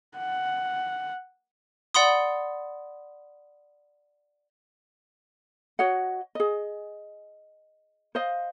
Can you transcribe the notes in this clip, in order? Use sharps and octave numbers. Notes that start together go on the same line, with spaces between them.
F#5
D5 F#5 B5 C6 D#6
F#4 C#5 D#5 F#5
G#4 D#5
C5 D#5 F5